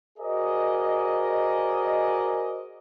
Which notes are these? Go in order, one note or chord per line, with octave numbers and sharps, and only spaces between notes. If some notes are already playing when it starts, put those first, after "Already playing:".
F#4 G#4 A#4 C5 D5 D#5